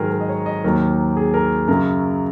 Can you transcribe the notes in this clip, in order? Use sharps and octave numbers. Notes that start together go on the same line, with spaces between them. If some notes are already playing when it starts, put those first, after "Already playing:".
Already playing: G#2 D#3 F#3 G#4 A#4 A#5
A#4
D#5
C#5
D#5
D#2 D#3 F#3 A#4
G#4
A#4
F#2 C#3 F#3 A#4